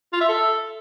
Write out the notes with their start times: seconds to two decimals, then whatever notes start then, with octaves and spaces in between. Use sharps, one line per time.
0.13 F4
0.21 E5
0.29 A4